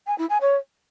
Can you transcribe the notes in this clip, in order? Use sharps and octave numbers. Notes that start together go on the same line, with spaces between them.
G#5
E4
G#5
C#5